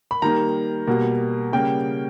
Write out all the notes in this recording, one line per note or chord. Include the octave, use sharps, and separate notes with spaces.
B5
D#3 G3 A#3 A#5
B2 G3 A#3
C#3 G3 A#3 G5